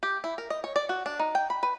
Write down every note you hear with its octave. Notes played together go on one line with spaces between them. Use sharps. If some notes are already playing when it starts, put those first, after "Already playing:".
G4
E4
A#4
D#5
C#5
D5
F#4
D4
D#4
G5
B5
B4